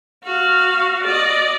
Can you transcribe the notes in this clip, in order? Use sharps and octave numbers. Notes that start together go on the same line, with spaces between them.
F#4 F5
D5 D#5